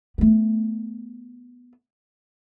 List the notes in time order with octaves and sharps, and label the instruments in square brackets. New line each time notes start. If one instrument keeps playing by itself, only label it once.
[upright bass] A3 B3